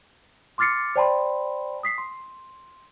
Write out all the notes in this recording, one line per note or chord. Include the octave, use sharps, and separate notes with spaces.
C6 D6 F6 A6 C7 C#7
C5 D5 G5 A5 B5 C6
D#6 B6 C7
C6